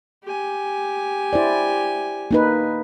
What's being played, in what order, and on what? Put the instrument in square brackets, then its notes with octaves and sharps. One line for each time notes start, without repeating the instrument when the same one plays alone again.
[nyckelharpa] G4 G#5
[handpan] E4 C5 D5
A#3 D#4 B4